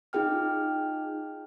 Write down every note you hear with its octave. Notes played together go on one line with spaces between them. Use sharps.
D#4 F4 G#4 G5 F6